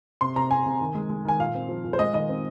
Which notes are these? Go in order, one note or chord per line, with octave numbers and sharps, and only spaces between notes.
C3 C6
C3 A#5
C3 G#5
C3
D#3
G#3
G#3
D#3 G#5
A#2 F5
C4
F3
A#2
C5
G#3 D#5
D#3 D#5
C4